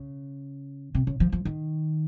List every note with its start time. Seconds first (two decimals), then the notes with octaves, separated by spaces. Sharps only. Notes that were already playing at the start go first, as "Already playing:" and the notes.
Already playing: C#3
0.95 C3
1.07 C#3
1.20 F3
1.32 F3
1.45 D#3